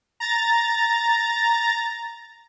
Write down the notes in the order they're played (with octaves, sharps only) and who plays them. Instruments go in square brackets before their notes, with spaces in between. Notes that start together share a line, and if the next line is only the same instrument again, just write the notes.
[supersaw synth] A#5 A6